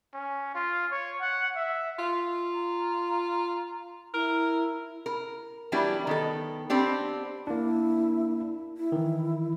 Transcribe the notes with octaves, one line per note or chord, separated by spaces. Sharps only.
C#4
F4
C#5
F#5
E5
F4
A#5
E4 A#4
A#4
E3 F#3 G3 B3 D4 E4
D#3 B3 A4
B3 C4 D4 G4
A#3 D4 E4
E4
D#3 E3